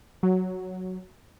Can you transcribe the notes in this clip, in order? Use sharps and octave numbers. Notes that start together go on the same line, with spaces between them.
F#3